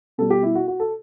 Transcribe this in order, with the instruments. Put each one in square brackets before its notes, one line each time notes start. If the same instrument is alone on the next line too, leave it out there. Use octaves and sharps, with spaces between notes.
[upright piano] B2 G3 A4
G4
E4
F#4
F#4
A4